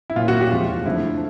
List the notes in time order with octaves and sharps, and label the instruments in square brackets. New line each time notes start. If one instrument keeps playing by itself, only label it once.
[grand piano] E4
A#2 F#3 A#3 F4
F#4
G4
E2 C3 F3 G#3 F4
F2 D3 F3 A3 E4